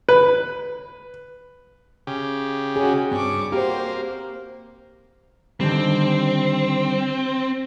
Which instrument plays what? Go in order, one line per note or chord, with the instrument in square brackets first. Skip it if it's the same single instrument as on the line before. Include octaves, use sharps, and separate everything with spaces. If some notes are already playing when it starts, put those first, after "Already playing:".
[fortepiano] B4
[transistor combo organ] C#3 G4
[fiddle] C#4 F#4 [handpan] G#4
[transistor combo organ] G2 [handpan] C4 [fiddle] C#6 D6
[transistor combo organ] A#3 [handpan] F#4 G4 [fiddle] C5
[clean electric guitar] D3 D#3 G3 [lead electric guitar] C4